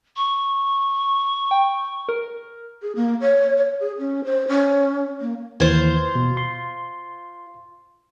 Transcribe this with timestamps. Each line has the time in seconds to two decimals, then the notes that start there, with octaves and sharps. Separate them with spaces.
0.17 C#6
1.51 G5
2.09 A#4
2.82 G#4
2.96 A#3
3.21 C#5
3.57 C#5
3.80 G#4
3.99 C#4
4.25 C5
4.48 C#4
5.21 A#3
5.60 D#2 E3 F4 C5 G#6
6.15 B2
6.37 C6